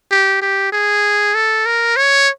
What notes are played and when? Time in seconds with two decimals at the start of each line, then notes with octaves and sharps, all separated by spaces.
0.11 G4
0.42 G4
0.72 G#4
1.34 A4
1.66 A#4
1.96 C#5